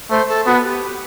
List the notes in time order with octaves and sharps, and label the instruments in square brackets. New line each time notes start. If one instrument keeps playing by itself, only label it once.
[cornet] A3 [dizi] C5
[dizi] A4
[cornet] B3 [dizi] F#4
[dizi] G4